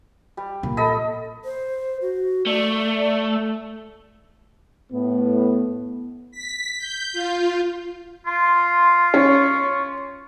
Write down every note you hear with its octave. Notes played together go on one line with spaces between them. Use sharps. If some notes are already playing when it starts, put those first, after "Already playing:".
G3
A#2
A4 D#5 B5
C5
F#4
A3 D5
A2 B3
B6
G6
F4
F4 C6
C#4 C#6